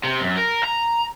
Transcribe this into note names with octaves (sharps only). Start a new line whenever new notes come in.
C3
F#2
A#4
A#5